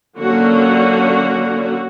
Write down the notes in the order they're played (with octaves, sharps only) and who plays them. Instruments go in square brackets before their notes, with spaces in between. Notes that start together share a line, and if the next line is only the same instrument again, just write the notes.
[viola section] D3 F#3 A#3 C#4 F#4